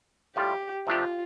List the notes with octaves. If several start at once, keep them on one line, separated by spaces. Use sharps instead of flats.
A2 G3 F4 G4
C3 F3 A3 D4 F4 G4